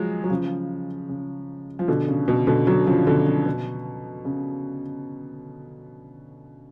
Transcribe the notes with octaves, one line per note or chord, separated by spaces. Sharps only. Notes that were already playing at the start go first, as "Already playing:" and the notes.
Already playing: F3 F#3 G#3
F#3
C#3 F3
C#3
F3
B2 D3
C#3
B2
B2 D3
D3 F#3
C#3 F3
B2 D3
C#3
B2
C#3